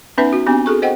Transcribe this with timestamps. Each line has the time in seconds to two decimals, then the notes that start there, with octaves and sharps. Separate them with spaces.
0.18 B3 C#4 D#4 B4 E5 F#5
0.33 F#4
0.46 B3 C4 D4 G4
0.66 F#4 G#4 A4 C#6
0.82 C5 D#5 F#5 G5